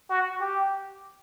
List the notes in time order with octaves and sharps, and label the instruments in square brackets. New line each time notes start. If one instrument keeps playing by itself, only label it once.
[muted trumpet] F#4
G4